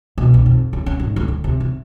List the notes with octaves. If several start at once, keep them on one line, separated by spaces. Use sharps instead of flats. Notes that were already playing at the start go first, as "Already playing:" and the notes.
B2
B1
F2
C#3
C#4
G#1
D2
D2
C3
C3